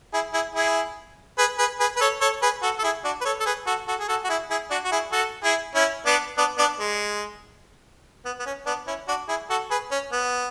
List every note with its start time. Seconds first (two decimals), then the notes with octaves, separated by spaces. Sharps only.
0.14 E4 G#4
0.34 E4 G#4
0.55 E4 G#4
1.38 G#4 B4
1.59 G#4 B4
1.80 G#4 B4
1.97 B4
2.01 A4 C#5
2.21 A4 C#5
2.42 G#4 B4
2.62 F#4 A4
2.79 A4
2.84 E4 G#4
3.04 D4 F#4
3.21 B4
3.25 A4 C#5
3.40 A4
3.46 G#4 B4
3.67 F#4 A4
3.88 F#4 A4
3.99 G#4
4.08 F#4 A4
4.24 F#4
4.29 E4 G#4
4.50 E4 G#4
4.70 D4 F#4
4.85 F#4
4.92 E4 G#4
5.12 F#4 A4
5.44 E4 G#4
5.75 C#4 E4
6.06 B3 D4
6.38 B3 D4
6.58 B3 D4
6.80 G#3
8.25 B3
8.40 B3
8.46 C#4
8.66 B3 D4
8.87 C#4 E4
9.08 D4 F#4
9.28 E4 G#4
9.50 F#4 A4
9.71 G#4 B4
9.92 C#4
10.12 B3